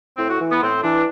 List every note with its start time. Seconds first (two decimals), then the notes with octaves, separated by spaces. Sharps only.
0.17 A2 C4
0.28 F#4
0.39 E3
0.51 B3
0.61 A2 C4
0.82 E3 D4